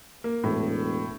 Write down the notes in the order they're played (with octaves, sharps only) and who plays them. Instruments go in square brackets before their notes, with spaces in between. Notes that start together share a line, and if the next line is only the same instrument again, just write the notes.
[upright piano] A#3
[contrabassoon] E1 [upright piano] A2